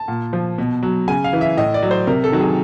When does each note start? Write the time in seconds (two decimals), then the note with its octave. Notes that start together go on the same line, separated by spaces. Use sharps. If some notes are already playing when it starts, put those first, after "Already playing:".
Already playing: A5
0.08 A#2
0.33 F3
0.58 B2
0.83 F#3
1.08 C#3 G#5
1.24 F5
1.33 E3
1.41 E5
1.57 A2 D#5
1.74 D5
1.83 F#3
1.91 C5
2.07 C3 A#4
2.24 A4
2.32 D#3 F#3
2.41 G#4